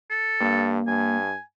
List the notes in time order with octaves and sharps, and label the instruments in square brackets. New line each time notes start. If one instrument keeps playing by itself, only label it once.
[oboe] A4
[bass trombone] G2 [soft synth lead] A#3
[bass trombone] G2 [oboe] G#5